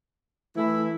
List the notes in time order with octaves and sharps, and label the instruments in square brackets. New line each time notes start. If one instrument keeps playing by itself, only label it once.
[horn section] E3 A3 E4